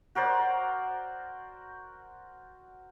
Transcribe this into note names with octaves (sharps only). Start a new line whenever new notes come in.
F#4 A#4 C5 D5